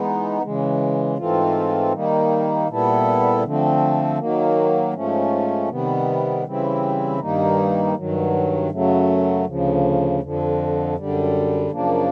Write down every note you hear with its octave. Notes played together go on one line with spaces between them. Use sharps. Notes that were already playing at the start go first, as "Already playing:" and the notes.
Already playing: E3 G#3 B3 D#4
C#3 E3 G#3
G#2 E3 A3 C4 F4
D#3 G3 A#3 D#4
A#2 G3 B3 E4 A4
D3 F3 A3 C4
D#3 F#3 A#3
G#2 F3 A3 C#4
C3 D#3 G3 B3
C#3 E3 G3 C4 E4
G2 D#3 G3 A#3 D#4
G2 D#3 F#3
F#2 C#3 F#3 A3
D2 C#3 F3
F2 D3 F3
F#2 D3 G3
F#2 C#3 F3 A#3 D4